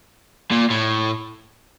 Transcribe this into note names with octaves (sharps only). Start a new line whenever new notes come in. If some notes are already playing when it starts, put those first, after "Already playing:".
A#2
A2